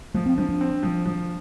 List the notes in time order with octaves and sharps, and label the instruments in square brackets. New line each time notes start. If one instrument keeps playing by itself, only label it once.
[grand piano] F3 [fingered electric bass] A3
[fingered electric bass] C4
[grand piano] F3 [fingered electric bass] D4
[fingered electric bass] D4
[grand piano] C4
F3
F3